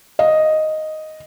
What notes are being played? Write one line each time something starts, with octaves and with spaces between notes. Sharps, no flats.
D#5